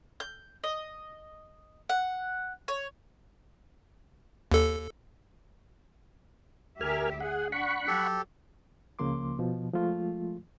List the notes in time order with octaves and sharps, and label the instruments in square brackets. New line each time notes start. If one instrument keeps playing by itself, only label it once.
[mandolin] G6
D#5
F#5
C#5
[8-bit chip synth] D#2 A4
[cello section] D2 G4 E5 [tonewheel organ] A#4 G#5 F6
[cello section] G#4 [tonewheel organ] F#5
[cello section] D4 [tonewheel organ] F#5 B5 C#6
[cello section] F#3 [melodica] G4 A4
[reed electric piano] C#2 C#3 F3 A#3 C6 D6
B2 F3
F3 G#3 A3 F4